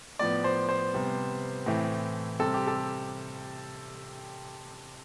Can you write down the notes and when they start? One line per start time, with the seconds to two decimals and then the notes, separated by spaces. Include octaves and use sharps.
0.19 A2 F3 B3 D5
0.44 C5
0.69 C5
0.93 C3 G3 B3
1.66 A2 E3 A3 C4
2.39 C3 G3 C4 A4
2.54 G4
2.67 A4